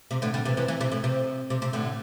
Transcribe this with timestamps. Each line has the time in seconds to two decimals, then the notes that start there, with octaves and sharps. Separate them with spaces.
0.11 C3
0.22 A2 D3
0.34 D3 G3
0.45 C3 E3
0.57 C3 E3
0.68 C3 E3
0.81 C3
0.92 A2
1.04 C3
1.50 C3
1.62 C3
1.73 A2 D3